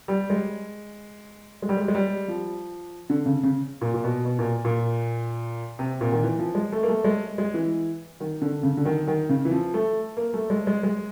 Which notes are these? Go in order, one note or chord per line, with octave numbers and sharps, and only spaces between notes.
G3
G#3
G#3
G3
G#3
G#3
G3
F3
D3
C#3
C#3
A#2
A#2
B2
B2
A#2
A#2
C3
A#2
D#3
E3
F3
G#3
A3
A#3
A3
G#3
G#3
E3
D#3
D3
C#3
D3
D#3
D#3
C#3
E3
F3
A3
A#3
A3
G#3
G#3
G#3